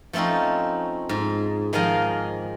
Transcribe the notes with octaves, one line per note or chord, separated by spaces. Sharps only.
F3 A3 C4 C#4 D#4
G#2
D#3 F3 G#4 A#4 D#5 F5